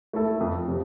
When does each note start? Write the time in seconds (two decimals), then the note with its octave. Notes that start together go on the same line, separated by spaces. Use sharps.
0.13 A3 E4 A4
0.40 F2
0.68 C3 F3